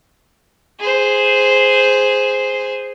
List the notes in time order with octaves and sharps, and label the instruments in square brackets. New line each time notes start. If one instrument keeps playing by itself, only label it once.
[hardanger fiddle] G#4 C5